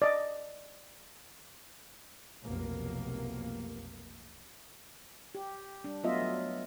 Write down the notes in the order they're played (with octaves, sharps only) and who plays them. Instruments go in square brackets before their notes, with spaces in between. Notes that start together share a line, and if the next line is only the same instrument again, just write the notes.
[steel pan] D5 D#5
[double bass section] F1 B1 A#3
[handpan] G4
G3 D4
F#3 A3 B3 F4 D#5 E5
F#3